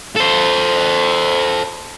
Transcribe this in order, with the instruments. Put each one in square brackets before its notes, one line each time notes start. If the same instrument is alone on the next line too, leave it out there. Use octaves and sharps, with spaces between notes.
[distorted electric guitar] A4 C5